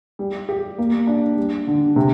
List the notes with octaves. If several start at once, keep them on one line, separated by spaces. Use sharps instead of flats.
G3
G4
A#3
D4
G3
D3
C3